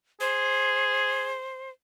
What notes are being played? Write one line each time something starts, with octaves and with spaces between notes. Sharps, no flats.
G#4 C5